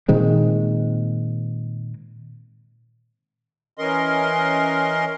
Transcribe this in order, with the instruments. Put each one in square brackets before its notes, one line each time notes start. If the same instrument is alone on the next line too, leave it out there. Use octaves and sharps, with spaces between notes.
[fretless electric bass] A#2 D#3 G#3 C4
[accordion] E3 C#4 A#4 D#5 C6